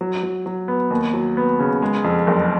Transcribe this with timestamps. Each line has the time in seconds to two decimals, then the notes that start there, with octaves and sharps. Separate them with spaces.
0.01 F#3
0.23 F#3
0.46 F#3
0.68 B3
0.90 D#2
1.13 F#3
1.37 B3
1.60 C#3
1.82 G#3
2.04 F2
2.27 F#1